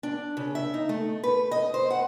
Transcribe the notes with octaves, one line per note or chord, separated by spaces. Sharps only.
D4
C#3
E5
D#4
A3
B4
D#5
C5
F#5